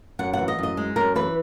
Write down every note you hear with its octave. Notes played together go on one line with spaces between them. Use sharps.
F#2 F#5
E3 F#5
D#5
F#2 D#5
G#3
F#2 A#4
E3 B4